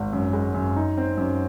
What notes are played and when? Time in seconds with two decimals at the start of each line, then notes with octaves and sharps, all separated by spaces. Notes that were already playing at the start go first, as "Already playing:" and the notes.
Already playing: G#1
0.13 F#2
0.33 G#3
0.54 F#2
0.76 D#4
0.97 C4
1.18 F#2